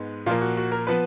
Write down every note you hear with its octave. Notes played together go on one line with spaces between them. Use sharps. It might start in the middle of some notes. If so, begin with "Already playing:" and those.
Already playing: G#2 G#3 B3
A#2 F3 A#3 F4
F#4
F#4
A#4
F3 B3 B4